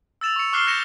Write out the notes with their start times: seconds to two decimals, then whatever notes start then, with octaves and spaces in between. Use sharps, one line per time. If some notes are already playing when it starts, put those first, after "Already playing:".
0.21 E6 A6 E7 F7
0.36 C#6 C#7
0.53 C#6 D6 F6 F#6 C7 G7
0.67 G6 A#6 C#7 E7